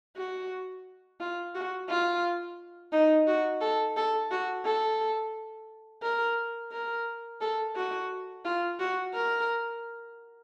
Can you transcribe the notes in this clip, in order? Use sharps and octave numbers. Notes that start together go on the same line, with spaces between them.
F#4
F4
F#4
F4
D#4
F#4
A4
A4
F#4
A4
A#4
A#4
A4
F#4
F4
F#4
A#4